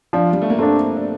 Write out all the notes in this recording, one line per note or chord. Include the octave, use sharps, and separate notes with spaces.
F3 D4
G3
A3
A#3
A3 C4 D4
D4